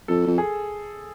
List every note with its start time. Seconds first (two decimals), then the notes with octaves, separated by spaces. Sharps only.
0.08 F2 A4
0.27 F2
0.38 G#4